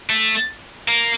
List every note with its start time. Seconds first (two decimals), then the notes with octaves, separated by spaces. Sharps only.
0.10 A3
0.88 A#3